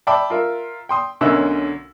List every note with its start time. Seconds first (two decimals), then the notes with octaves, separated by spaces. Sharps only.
0.07 D5 E5 G5 A5 B5 D6
0.30 F4 A#4 E5
0.89 G5 C6 D#6
1.21 B1 D3 C#4 A#4 E5 E6